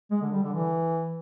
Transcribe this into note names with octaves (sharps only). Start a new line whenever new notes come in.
G#3
D3
G3
D3
E3